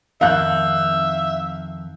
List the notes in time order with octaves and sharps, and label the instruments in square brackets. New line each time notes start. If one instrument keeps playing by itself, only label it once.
[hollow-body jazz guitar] F2 D#3 [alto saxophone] E5 [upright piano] F5 F#6 G6